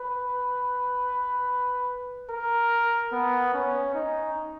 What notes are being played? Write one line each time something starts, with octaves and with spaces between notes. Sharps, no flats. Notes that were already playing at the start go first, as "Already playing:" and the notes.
Already playing: B4
A#4
B3
C#4
D#4